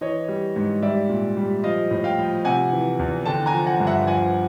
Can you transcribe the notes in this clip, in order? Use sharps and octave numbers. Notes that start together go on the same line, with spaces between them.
E3 C#5 D#5
G3
G#2
G3 D5 E5
A#2
G3
F3 D#5 F5
A2
F5 G5
F3
C3 F#5 G#5
E3
E2
D3 G5 A5
G#5 A#5
F3
F#5 G#5
G2
E5 F#5
F3 F#5 G#5